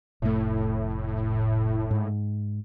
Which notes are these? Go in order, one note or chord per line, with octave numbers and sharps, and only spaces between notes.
F1 A2 A3
G#2